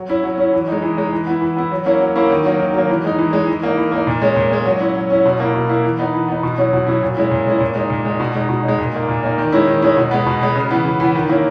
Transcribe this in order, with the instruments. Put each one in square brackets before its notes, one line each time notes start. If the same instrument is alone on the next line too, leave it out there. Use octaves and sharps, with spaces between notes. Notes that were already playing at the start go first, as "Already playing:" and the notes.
Already playing: [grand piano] F#3
C#4 E4
F#3
C#4 E4
E3
G#3 D#4
E3
G#3 D#4
E3
B3 E4
E3
B3 E4
F#3
A#3 C#4 E4
F#3
A#3 C#4 E4
D#3
F#3 A#3
D#3
F#3 A#3
E3
G#3 D#4
E3
G#3 D#4
E3
A#3 D#4
E3
A#3 D#4
A#2
G#3 C#4
A#2
G#3 C#4
F#3
C#4 E4
F#3
C#4 E4
B2
A#3 E4
B2
A#3 E4
E3
B3 D#4
E3
B3 D#4
B2
F#3 C#4 E4
B2
F#3 C#4 E4
A#2
G#3 C#4 E4
A#2
G#3 C#4 E4
A#2
G#3 D#4
A#2
G#3 D#4
B2
G#3 D#4
B2
G#3 D#4
A#2
A#3 D#4
A#2
A#3 D#4
D#3
G#3 C#4 E4
D#3
G#3 C#4 E4
B2
G#3 B3
B2
G#3 B3
C#3
E3 B3
C#3
E3 B3
D#3
A#3 C#4 E4